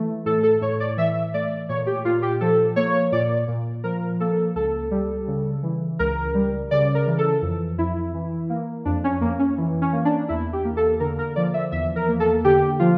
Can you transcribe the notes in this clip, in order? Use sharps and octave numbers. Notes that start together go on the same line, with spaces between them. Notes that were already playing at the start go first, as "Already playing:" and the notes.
Already playing: E3 A3
A2 A4
A4
A2 C#5
D5
E3 E5
A3 D5
A#2 C#5
G4
A#2 F4
G4
F3 A4
A#3 C#5
A#2 D5
A#2
F3 A#4
A#3 A4
C#2 A4
G3
C#3
E3
C#2 A#4
G3
C#3 D5
A#4
E3
A4
F2
F2 E4
E3
A#3
F2 D4
C#4
F2 A#3
C#4
E3
C#4
A#3
D4
E2 E4
G4
A#3
A4
D3 A#4
A#4
F3 D5
E5
E2 E5
A#4
A#3
A4
D3 G4
F3 F4